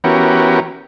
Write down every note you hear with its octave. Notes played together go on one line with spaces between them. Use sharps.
E3 B3 C#4 F#4 G4 A#4